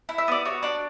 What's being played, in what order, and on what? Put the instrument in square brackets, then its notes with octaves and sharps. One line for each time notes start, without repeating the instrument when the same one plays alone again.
[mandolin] E4
E5
B3 D5
F#4 C#5
D4 D5